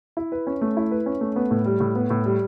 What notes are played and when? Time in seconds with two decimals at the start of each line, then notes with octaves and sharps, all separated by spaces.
0.17 E4
0.32 B4
0.47 C#4
0.61 A3
0.77 E4
0.91 B4
1.06 C#4
1.21 A3
1.36 B3
1.51 A2
1.66 G3
1.80 A2
1.96 B3
2.10 A2
2.25 G3